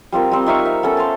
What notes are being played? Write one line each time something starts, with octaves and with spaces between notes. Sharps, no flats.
G3 C4 F4 A#4
G3 C4
D#4 E5 F5 C#6
E5
B3 C#4 A4
C5 F5 A5